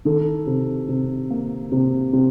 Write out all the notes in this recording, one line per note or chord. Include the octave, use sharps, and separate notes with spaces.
D#3 A4
C3
C3
A#3
C3
C3